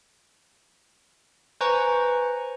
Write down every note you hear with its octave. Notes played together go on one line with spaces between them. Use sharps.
B4 C5 G#5 A#5 C#6